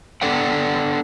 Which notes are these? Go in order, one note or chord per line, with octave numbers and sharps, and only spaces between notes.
B3 D4 A4 D5 F#5 G5